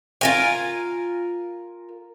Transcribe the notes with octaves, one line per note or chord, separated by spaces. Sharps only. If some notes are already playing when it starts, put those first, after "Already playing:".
F4 A#4 G#5